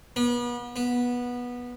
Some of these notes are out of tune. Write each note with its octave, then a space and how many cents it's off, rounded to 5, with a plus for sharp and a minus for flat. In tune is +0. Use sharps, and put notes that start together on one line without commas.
B3 -35
B3 -15